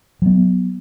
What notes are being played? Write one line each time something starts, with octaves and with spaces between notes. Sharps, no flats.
F#3 B3